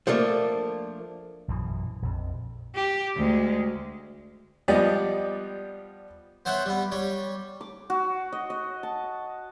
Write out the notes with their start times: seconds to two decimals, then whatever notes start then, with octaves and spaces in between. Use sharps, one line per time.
0.07 F3 A3 A#3 D4
1.48 A#1 F#2 B2 E3
2.02 A#1 F2
2.75 G4
3.15 D2 G#3
4.68 F3 G3 B3 G4 D5 D#5
6.45 B3 C5 C#5 E5 F#5
6.65 G3 B3
6.92 G3 C#5
7.61 D6
7.90 F#4
8.32 D#5
8.50 D#5
8.83 A5